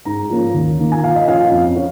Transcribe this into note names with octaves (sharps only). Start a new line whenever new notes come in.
G#2 A#5
F3 A#3 C#4
D#2
D#3 A#3
G#5
A#2 F5
D#5
F3 C#4 F5
F2
C#4